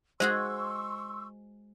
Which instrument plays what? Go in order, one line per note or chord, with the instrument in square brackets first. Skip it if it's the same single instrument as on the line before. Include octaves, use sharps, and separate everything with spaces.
[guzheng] G#3 F#4 G#4 [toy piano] C5 [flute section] C6 C#6 E6